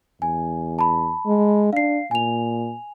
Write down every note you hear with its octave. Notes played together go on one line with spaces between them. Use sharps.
E2 G#5
A5 B5
G#3
D4 F5 C7
A#2 G#5 F7